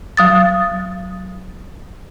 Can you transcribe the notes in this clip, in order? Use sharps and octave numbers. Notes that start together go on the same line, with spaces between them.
F#3 D#6 A6